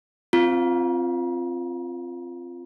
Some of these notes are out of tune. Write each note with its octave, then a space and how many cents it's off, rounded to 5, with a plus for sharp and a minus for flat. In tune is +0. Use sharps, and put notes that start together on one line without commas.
C4 +0 F4 -10